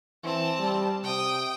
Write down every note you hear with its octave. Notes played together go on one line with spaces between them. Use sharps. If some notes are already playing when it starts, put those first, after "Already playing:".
E3 C4 A5
G3
C3 G5 D#6